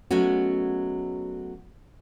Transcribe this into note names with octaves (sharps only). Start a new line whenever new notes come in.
F#3 G#3 A3 B3 C#4 F#4